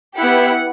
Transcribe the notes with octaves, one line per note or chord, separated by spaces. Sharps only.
B3 E4 G4 F#5